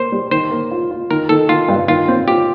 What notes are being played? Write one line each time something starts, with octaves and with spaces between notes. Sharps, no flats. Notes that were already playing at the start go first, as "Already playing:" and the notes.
Already playing: A#3 C5
G3
D#3 C5
A#3
F4
F4
D#3 A#4
D#3 A4
D#3 F4
G2
D#3 F4
C4
F4 G4